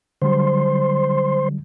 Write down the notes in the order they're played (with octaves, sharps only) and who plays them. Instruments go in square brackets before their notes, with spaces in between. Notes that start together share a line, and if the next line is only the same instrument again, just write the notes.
[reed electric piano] D3 F#3 G3 [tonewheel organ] C5 C6